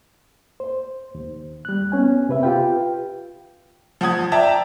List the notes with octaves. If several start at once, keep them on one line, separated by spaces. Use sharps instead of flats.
C5
D#2
G3 F#6
B3 C#4 G#5
C3 B4 E5
F4 G4 B4 F5 G5
F3 F#5 D#6 G#6
D5 E5 G5 A5 A#5